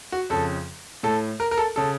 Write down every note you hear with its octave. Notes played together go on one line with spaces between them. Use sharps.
F#4
F2 C#3 A4
A2 A4
A#4
A#4
A4
C#3 A4